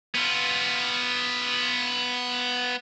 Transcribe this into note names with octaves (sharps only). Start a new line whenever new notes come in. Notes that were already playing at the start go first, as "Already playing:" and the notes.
B3 F4